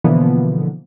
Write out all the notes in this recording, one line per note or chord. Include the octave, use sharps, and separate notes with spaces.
B2 D3 E3 F3 A#3 B3